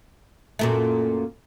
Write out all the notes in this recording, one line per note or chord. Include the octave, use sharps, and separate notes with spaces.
F#2 A#2 A3